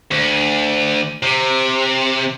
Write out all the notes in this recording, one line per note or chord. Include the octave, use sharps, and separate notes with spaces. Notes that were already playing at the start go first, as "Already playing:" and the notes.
D2
C3